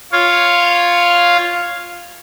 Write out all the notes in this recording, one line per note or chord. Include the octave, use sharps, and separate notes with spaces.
F4 C#5 F5